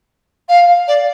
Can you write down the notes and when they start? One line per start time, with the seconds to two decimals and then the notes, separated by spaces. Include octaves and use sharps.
0.48 F5
0.88 D5